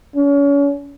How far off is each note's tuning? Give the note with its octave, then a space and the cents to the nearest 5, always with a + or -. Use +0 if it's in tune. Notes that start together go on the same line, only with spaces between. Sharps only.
C#4 +35